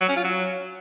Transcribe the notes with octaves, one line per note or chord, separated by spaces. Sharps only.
F#3
C#4
F4
F#3